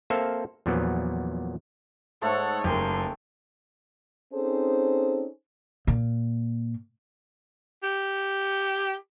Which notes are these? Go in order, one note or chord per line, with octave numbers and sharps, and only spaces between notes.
A#3 C4 A4 C5 E5 F5
E2 A#2 F3 F#3 B3
G#2 A3 A4 C#5 F#5
F#1 G4 A#4 G#5 C6
C4 C#4 D#4 G#4 A4 C5
A#2
G4